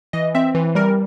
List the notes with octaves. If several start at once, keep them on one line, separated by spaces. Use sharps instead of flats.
E3 D#5
C4 E5
E3
G3 A#4